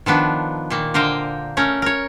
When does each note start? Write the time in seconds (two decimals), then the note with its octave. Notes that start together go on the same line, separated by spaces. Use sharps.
0.06 D#3 F3 B3 D4
0.70 A#2 D#3 A#3
0.94 D3 A#4 C5 D#5 F5 G5
1.57 A3 C#4 A#4 C#5
1.82 A#4 C#5